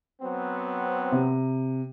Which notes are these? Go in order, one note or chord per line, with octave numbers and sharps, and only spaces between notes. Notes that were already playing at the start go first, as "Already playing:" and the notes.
F#3 B3 C4
C3